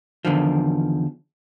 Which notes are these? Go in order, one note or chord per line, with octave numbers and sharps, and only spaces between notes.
E2 D3 D#3 F3